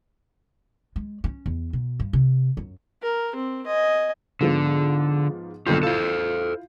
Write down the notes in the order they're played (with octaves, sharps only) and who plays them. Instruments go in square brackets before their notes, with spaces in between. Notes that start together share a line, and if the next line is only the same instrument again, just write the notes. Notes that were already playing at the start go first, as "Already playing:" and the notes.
[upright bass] G#3
C#4
E2
B2
G2
C3
F#2
[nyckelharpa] A#4
C4
D#5 G#5
[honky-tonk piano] G#2 F3 B3 [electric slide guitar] D3
[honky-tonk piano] B1 D3 G6 [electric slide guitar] F4 A4
[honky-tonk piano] E4 F4 [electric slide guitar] A4 C5